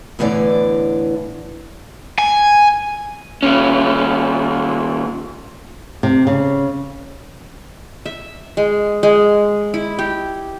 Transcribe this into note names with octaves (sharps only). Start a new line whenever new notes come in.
E2 A2 D3 E3 D5
G#5
D#2 C#4
C3
C#3
E5
G#3
G#3
E4
G4